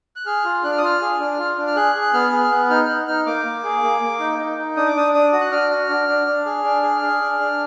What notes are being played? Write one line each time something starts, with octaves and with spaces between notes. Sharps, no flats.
F#6
G#4 F6
F4
D4 F#6
F6
D#6
F4 F6
G#4
D4
F4
D4
F6
G#4 F#6
G#4
F#6
B3 F6
G#4
F6
B3 F#6
D#4 F6
F6
D#4 F#6
D#4 F6
A#3 D6
A#3
G#4
A#3
A#3
D#4
D#4
D#4
D4 D#6
D6
D4 D#6
D4 D#6
F#4
F#6
D4 F6
F#4
D4
D4
D4
G#4
D4
G#4
G#4
D4
D4